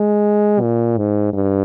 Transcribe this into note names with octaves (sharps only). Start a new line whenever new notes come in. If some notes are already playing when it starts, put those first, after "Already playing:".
Already playing: G#3
A#2
G#2
G2